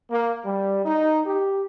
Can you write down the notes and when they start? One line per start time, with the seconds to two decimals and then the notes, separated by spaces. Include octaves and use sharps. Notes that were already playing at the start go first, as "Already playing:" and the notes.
0.11 A#3
0.45 G3
0.85 D#4
1.26 G4